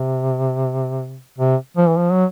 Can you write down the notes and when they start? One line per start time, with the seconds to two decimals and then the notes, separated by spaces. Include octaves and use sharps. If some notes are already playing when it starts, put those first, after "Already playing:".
Already playing: C3
1.38 C3
1.77 F3
1.88 E3
1.98 F3
2.12 F#3